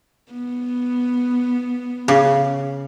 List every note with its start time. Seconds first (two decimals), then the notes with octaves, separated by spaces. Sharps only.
0.32 B3
2.08 C#3